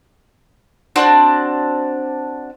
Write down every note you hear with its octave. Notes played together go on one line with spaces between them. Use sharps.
C4 D4 F#4